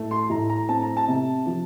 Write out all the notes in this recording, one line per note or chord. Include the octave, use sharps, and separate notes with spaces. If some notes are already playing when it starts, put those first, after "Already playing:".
Already playing: A2 A3
C6
A2 A#5
A#5
C4 A5
A#5
A5
C3
F3